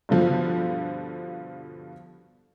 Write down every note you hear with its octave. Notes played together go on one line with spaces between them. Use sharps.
G2 B2 D3 F3